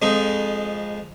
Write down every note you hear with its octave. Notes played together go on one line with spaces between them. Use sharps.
F2 G#3 D#4